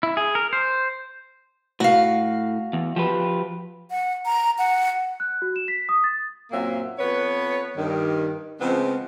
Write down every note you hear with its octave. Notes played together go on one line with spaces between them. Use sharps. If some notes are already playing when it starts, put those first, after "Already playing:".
E4
G#4
A#4
C5
A2 F#4 F5
E2
F3 G4 B4
F#5
A#5
F#5
F#6
F#4
E7
B6
D#6
A6
F#2 A#2 F#3 A#3 C4 E5
F2 B3 B4 C#5
G2 D#3
C#3 F3 G#3 B3 C4